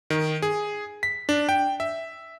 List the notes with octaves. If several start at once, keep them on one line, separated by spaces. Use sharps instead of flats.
D#3
G#4
B6
D4
G5
E5